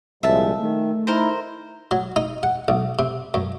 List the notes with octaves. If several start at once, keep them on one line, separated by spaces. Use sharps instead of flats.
C2 A#2 F3 G#3 E5 A5
D#3 A3
D#4 E4 A#4 C5
F#3
D#4
F#5
B1
C3
F#2